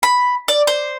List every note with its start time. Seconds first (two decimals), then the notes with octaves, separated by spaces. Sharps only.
0.03 B5
0.48 D5
0.67 C5